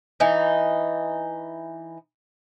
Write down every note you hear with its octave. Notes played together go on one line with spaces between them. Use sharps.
E3 D#4